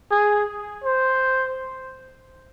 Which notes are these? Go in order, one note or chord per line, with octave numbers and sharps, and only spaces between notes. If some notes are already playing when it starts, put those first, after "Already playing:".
G#4
C5